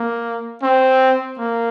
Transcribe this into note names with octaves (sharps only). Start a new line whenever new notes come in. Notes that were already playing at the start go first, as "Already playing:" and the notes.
Already playing: A#3
C4
A#3